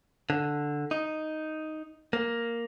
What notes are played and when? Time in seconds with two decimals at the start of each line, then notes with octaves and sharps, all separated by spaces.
0.30 D3
0.91 D#4
2.13 A#3